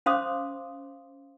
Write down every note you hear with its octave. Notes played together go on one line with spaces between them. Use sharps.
C#4 C5 F5 C6 D6 D#6